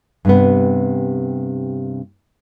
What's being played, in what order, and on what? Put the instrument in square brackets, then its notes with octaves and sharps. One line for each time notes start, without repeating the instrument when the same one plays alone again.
[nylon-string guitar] G2 C3 B3